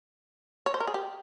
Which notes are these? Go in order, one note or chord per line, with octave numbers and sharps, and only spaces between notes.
C#5
C5
A#4
G#4
G4